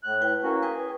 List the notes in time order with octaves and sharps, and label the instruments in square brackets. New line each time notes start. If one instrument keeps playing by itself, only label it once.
[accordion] A2 F#6
[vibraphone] E4 B4 G5
[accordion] A#3 C#4 F#4
[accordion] G#4 G#5 [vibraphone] B4 G5